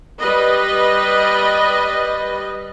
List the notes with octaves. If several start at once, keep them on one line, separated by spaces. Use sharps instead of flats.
G3 B4 D#5